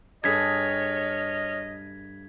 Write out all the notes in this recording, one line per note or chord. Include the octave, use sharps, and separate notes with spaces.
G2 G#4 A4 C#5 D#5 F6 G#6 B6